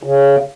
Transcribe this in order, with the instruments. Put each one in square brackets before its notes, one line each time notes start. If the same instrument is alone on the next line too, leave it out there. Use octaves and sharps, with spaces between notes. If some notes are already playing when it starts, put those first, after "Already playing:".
[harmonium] C#3